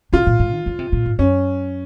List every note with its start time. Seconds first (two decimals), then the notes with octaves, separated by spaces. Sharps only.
0.13 C3 F4
0.26 A#2
0.40 G#2
0.52 D#3
0.66 C#3
0.79 C3
0.92 A#2
1.06 G#2
1.19 F#2 C#4